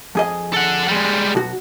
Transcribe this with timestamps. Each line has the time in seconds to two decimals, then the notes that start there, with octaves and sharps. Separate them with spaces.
0.15 F2 G#4 D#5
0.53 A4 F#5
0.88 G3 G#3
1.35 B1 F#4